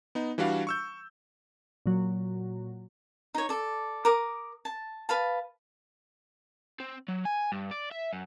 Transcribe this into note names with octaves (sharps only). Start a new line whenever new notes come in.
B3 D#4
E3 G3 D4 F#4 F5
C#6 E6 G6
A#2 F#3
D#4 C#5
A4 D5
A#4 D6 D#6
A5
B4 F5 A5
C4
F#3
G#5
G2
D5
E5
F#2